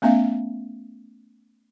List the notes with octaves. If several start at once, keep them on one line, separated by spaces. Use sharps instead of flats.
A3 B3 C#4 E5 F5